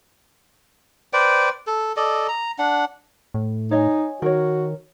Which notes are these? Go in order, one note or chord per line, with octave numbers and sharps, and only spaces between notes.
B4 C5 D5 G5
A4
A4 D5 D#5
A#5
D4 F#5
A2
D#4 C#5 D#5 G#5
D#3 F#4 A#4 C#5